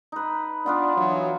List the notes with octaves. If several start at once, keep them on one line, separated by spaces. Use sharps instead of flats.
D#4 B4
B3 D4 F4 B4
E3 F#3